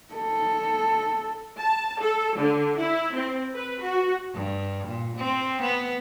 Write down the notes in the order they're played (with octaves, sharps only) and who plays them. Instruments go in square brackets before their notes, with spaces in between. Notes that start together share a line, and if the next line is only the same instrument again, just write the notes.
[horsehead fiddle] A4
[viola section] A5
A4
D3
E4
C4
B4
F#4
[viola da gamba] G2
A#2
C4
B3